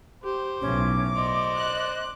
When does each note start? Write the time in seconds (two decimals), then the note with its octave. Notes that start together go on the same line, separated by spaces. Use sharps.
0.24 G4 C5
0.61 B1 A2 C#4 D6
1.16 C5 D5 D#5
1.57 F#6